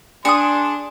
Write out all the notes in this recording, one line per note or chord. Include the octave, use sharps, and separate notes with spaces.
D4 G#4 C6 D#6 C#7